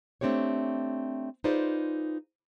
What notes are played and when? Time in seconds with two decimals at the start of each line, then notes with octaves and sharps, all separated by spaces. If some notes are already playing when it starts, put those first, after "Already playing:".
0.21 A3 C4 D4 G4 C#5
1.44 D#4 F4 G#4 B4 C5 D5